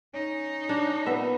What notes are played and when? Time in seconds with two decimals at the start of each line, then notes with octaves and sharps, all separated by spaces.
0.14 C#4 D#4
0.69 D4
1.06 A#2 B3 E5